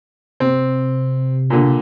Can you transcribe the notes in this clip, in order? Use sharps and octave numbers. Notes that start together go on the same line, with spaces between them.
C3 C4
A#2 D3